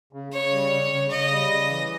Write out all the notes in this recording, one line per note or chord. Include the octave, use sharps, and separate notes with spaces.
C#3
C#3 C#5
G3
C#3
C#3
C#3 D#5
G3
C#3
E3